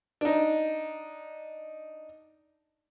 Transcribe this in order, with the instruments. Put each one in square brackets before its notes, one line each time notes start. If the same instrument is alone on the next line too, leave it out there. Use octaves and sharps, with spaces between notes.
[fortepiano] D4 D#4